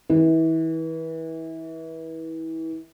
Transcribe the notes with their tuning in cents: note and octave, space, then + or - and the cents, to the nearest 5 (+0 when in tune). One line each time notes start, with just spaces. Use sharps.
E3 -30